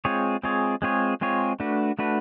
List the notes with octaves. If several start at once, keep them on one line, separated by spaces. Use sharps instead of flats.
G#3 C4 F4 G#4 C#5
G#3 C4 F4 G#4 C#5
G#3 C4 F4 G#4 C#5
G#3 C4 F4 G#4 C#5
A3 D4 F#4 B4
A3 D4 F#4 B4